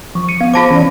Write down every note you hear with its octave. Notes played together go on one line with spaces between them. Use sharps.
F3 C#6
C#7 D#7
B3 F5
F4 C5 A5 D6 A#6
E3 C#4 D5